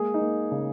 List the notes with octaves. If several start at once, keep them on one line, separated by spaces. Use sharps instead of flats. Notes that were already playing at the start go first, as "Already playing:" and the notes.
Already playing: G#3 A#3 G#4
D#4
A#3
C#3